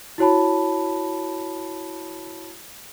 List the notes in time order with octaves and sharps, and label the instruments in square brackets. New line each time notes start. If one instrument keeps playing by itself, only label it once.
[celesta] E4 F#4 C#5 A5 B5